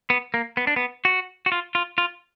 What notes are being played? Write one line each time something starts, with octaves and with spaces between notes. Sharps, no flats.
B3
A#3
B3
D4
B3
F#4
F#4
F4
F4
F4